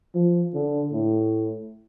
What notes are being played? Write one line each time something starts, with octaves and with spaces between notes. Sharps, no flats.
F3
D3
A2